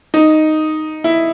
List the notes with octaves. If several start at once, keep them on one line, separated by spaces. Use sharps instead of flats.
D#4
E4